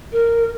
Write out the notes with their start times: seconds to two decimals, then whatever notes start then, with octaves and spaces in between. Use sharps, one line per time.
0.12 A#4